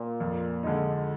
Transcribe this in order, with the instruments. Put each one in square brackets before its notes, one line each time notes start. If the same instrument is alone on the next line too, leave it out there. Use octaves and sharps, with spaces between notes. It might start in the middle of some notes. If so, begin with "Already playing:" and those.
Already playing: [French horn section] A#2
[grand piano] F2
D3 G#3 D#4